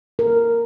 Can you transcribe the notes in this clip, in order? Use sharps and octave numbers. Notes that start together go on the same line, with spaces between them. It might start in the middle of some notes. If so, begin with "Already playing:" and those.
A#4